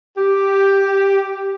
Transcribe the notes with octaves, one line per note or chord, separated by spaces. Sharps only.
G4